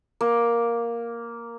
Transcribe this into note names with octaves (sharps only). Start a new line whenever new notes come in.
A#3